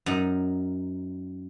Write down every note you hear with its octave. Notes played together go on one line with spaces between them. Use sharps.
F#2 D#4